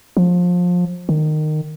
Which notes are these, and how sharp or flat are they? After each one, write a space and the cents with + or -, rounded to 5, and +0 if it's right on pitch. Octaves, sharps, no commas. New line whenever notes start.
F3 +25
D#3 -20